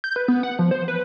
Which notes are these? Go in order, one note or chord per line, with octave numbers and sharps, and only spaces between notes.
G6
B4
B3
F#5
F3
C5
B4